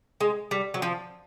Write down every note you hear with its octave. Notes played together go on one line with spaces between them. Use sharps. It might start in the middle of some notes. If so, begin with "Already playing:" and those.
G#3
G3
F#3
F3